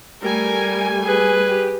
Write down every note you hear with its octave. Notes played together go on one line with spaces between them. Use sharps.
G3 A3 A#4 G#5
G#4 B4
G4